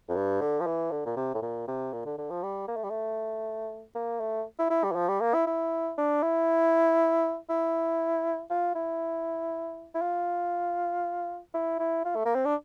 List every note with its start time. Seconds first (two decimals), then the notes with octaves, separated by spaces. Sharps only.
0.09 F2
0.16 G2
0.41 D3
0.60 F3
0.67 E3
0.91 D3
1.06 A#2
1.17 C3
1.35 A2
1.42 A#2
1.68 C3
1.93 A#2
2.06 D3
2.18 D3
2.30 F3
2.44 G3
2.68 A#3
2.76 A3
2.84 G3
2.90 A3
3.95 A#3
4.20 A3
4.59 E4
4.70 E4
4.84 G3
4.92 E3
4.96 F3
5.09 G3
5.21 A#3
5.34 E4
5.47 E4
5.98 D4
6.23 E4
7.50 E4
8.50 F4
8.75 E4
9.95 E4
10.02 F4
11.54 E4
11.80 E4
12.05 F4
12.16 A3
12.26 A#3
12.35 C4
12.45 D4